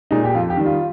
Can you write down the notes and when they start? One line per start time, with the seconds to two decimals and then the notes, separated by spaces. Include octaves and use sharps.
0.11 A#2 G#3 D#4
0.24 G4
0.34 F2 F4
0.50 G4
0.57 D#3 G3
0.66 F4